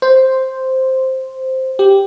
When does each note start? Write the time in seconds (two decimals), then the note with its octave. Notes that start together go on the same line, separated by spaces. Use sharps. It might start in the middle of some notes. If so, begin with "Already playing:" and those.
0.02 C5
1.79 G4